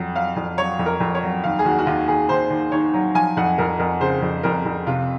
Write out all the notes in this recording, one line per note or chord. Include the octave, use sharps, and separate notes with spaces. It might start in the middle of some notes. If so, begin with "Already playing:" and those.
Already playing: F2 F#3
F#3 F5
F2
F#3 C#5
F2
A#4
F2
C#5
F#3
D#2 F5
G#4
D#2 F#4
F#4
D#2 F4
D#2 G#4
D#2 C5
D#2
D#3 C#5
F#3
F3 G#5
F2 F#5
F2 A#4
F2 A#4
C#3 C5
F2
F2 A#4
F2
C3 F4